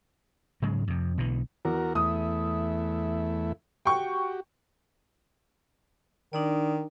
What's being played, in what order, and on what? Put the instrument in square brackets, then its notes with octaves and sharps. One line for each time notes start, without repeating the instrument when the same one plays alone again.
[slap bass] G#2 C#3 F#3 G#3
F2 C3
B1 B2 D3 E3
[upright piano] E2 [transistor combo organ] F#4 A#4
[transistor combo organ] E2 A3 E4 [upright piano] D#6
[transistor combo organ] F#4 G4 [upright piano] G5 C#6
[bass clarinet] D#3 [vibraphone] D4 D#4 D5